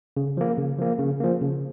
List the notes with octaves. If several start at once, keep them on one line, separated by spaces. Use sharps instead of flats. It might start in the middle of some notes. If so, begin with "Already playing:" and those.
C#3
F3 A#3
C#3
F3 A#3
C#3
F3 A#3
C#3